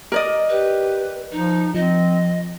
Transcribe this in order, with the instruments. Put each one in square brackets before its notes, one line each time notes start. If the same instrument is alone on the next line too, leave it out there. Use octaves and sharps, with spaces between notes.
[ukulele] A#4 D5 D#5
[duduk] G4 [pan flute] B4
[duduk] F3 [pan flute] D#4
[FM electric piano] F3 [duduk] C4 [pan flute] D#5